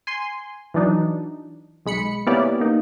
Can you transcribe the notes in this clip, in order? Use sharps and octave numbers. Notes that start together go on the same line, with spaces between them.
G#5 C6
E3 F#3 D4 D#4
B1 G#3 B5 C#7
A#3 B3 C#4 E4 G4 D5
A#3 D#4